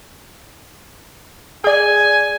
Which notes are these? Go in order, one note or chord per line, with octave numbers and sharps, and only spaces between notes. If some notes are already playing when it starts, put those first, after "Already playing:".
G#4 D5 G#5